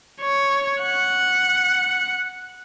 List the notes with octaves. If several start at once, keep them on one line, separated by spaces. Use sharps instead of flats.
C#5
F#5